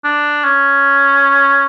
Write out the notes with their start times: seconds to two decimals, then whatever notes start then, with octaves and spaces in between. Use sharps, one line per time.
0.04 D4
0.44 C#4